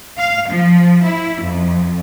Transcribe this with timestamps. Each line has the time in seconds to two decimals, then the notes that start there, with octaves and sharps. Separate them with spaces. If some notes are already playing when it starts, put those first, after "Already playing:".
0.19 F5
0.51 F3
1.06 E4
1.43 F2